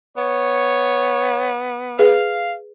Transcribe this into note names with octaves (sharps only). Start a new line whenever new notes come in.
B3 C#5
G#4 B4 F5